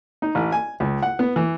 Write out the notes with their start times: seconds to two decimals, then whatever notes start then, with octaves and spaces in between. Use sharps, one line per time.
0.22 D#4
0.35 A1
0.52 G#5
0.80 C#2
1.02 F#5
1.19 B3
1.36 E3